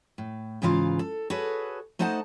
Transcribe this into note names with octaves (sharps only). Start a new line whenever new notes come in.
A2
G#2 C#3 E3 A#3 F4 F5
A4
F#4 G#4 A4 B4 C#5
A3 D#4 C5 D#5 F#5 A5